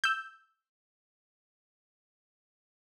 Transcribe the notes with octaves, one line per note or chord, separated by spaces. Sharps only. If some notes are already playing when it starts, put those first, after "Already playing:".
E6 G6